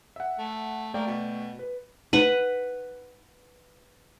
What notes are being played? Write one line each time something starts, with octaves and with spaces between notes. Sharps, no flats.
E5 F#5
A3
A3 A#3 D5 G5
B2
B4
B4 F#5